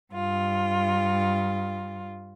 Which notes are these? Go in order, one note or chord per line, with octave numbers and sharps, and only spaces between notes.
G2 F4